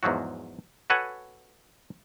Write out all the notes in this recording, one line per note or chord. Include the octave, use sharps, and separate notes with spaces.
E2 G#2 F3 F#3 F#4
F#4 A4 B4 C#5 F#5 G#5